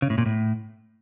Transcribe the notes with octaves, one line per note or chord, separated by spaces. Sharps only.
C#3
A2
A#2
A2